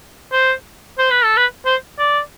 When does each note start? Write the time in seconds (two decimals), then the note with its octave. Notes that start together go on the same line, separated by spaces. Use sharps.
0.32 C5
0.98 C5
1.11 B4
1.24 A4
1.37 B4
1.66 C5
1.99 D5